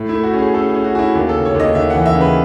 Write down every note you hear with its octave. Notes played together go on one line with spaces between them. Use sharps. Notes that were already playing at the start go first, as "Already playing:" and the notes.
Already playing: A2
E4
A3
F#4
C#4
G#4
C#4 A4
G#4
C#4
F#4
C#4 E4 F#4
D#2 F#4
A4
C#3
C#5
D#2 D#5
D#2 E5
F#5
E3
E5
C#3
B4